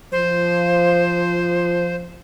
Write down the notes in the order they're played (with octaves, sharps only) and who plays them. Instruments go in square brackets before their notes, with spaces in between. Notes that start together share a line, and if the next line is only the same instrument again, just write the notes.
[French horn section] F3 [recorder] C5